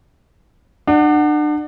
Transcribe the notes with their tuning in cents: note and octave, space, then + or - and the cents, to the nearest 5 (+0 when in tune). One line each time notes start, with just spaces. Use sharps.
D4 +35 F#5 +0